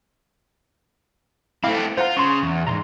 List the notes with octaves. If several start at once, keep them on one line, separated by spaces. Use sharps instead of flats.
A3 C4 E4 F5 D6
F4 C5 F#5 A#5
C#3 C6 C#6
E2
C2 G#2 A#5 C6